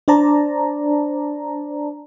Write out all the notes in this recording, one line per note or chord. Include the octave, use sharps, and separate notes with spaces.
D4 C5 D5 A5 A#5